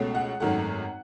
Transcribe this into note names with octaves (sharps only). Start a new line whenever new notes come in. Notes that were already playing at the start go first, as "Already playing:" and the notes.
Already playing: C#2 B2 A3 C#4
F#5
G#1 F#2 D#3 A3 F#5